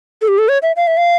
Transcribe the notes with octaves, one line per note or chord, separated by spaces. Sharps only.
A4
G4
A4
C#5
E5
F5
E5
F5